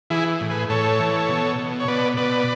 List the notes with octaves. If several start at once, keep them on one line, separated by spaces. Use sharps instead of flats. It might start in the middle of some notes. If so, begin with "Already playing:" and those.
E3 E4 G#4
A2
G#4 B4
A2 A4 C#5
E3
B2
B2
C#5
B2 B4 D5
B2 B4 D5